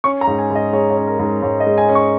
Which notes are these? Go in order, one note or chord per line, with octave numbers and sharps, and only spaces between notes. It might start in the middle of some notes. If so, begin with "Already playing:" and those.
C#4 C#6
A#5
G#2
G#5
G#2 D#5
G#3 C#5
C#5
C#4
A#4
G#2
A#4
G#2 C#5
D#5
G#3
G#5
C#4
C#6